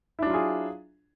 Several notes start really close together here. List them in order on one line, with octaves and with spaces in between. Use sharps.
E4 D4 F#3 F4 G#4